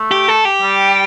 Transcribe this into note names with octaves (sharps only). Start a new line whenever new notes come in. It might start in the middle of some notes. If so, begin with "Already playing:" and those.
Already playing: A3
G4
A4
G4
G3